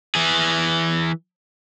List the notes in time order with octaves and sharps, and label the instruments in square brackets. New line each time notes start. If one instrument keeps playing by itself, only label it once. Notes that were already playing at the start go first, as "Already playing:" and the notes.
[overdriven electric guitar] E3 G#4